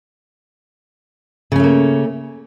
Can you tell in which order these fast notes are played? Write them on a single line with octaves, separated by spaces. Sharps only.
C#3 C#4 A3 A#3